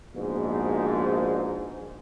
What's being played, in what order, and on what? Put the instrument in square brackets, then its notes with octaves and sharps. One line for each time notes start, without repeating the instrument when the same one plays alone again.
[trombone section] A#1 G#2 B2